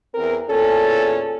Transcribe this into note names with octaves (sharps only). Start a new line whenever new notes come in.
E2 C4 A#4
E2 A#2 C#4 A4